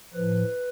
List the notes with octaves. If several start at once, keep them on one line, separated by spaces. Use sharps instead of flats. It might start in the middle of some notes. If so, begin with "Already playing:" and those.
A2 F3 B4